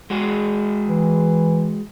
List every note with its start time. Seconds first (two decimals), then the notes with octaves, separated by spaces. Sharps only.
0.10 G#3 F#4 G#4
0.88 E3